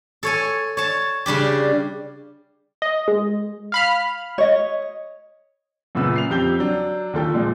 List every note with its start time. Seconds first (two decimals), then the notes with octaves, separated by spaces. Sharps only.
0.23 A4 C#5 G#5
0.77 C#5 A5
1.26 C#3 G3 D4 G4
2.82 D#5
3.08 G#3
3.72 F5 B5 F6
4.38 C#5 D#5
5.95 F#2 A#2 C#3 B3 B4 E6
6.16 C7 F7
6.30 F2 G4 G6 G7
6.59 F#3 D4
7.13 D#2 F4 A4 G5
7.34 A#2 F3 G#3